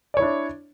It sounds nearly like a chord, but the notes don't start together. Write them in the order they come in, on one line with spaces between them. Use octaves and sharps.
D5 C#5 E4 D4